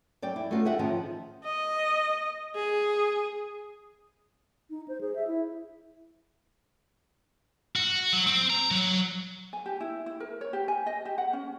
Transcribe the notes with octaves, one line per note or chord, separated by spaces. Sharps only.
F#2 D5 G5
E4
A3 B3 C#4 F4 F#4
G#4 E5 F#5 G5
D#3 F3 C#4 D#5
D#5
G#4
D#4
C5
G#4
E5
E4
F#4
F#3
C4
A#5
F#3
G#5
G4
E4
E4
A#4
C#5
G4
G#5
D#5
G4
F#5
C#4